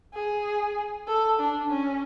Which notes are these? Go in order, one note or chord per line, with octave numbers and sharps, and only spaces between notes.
G#4
A4
D4
C#4